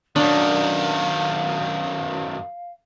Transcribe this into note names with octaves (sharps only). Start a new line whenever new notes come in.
F#2 D#3 D4 F5